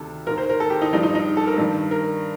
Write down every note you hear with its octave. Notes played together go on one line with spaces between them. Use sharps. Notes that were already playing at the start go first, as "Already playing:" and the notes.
Already playing: D2 C3 D#3 A4
D#2 D#3 A#4
C5
A#4
A4
G4
D#4
G2 F3 D#4
D#4
D#4
A4
A#4
G2 D#3
A#4